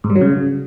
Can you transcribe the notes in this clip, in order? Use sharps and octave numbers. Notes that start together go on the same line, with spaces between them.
G#2
G3
F#3
C#3